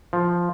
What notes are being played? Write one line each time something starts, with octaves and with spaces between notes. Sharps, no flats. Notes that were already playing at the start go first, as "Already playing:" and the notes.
F3